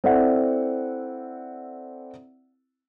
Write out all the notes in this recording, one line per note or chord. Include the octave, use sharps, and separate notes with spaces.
C4 E4 A4 D5 E5 F#5